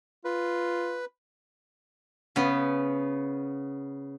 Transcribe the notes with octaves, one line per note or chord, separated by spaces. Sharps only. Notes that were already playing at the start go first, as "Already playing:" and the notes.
F4 B4
C#3 B3